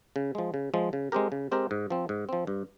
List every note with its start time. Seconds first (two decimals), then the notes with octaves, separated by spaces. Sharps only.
0.16 C#3
0.35 F3 G#3
0.54 C#3
0.74 F3 G#3
0.93 C#3
1.12 G#3 C4 G4 A#4
1.32 C#3
1.51 G#3 C4 G4 A#4
1.71 G#2
1.90 F3 C4
2.09 G#2
2.29 F3 C4
2.47 G2